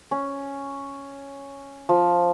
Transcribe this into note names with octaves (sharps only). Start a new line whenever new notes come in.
C#4
F3